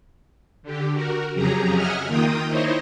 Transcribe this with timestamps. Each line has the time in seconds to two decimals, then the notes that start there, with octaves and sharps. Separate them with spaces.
0.63 D3 G4
0.93 F#4 A#4
1.34 F2 C#3 F#3 G4 G#4 A#5
1.74 D#5 E5 F#5 G#5 F6
2.06 D#3 A#3 F4 G5 D#6
2.47 D#4 E4 C5 C#5 D#5